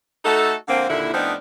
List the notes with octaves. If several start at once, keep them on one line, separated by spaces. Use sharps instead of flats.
A3 D#4 F#4 A4
D3 F3 A#3 C4
D#2 A#2 D3 E4
A2 F3 B3 C4 D4 D#4